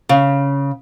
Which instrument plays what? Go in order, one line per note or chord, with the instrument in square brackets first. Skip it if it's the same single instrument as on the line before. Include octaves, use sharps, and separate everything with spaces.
[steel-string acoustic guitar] C#3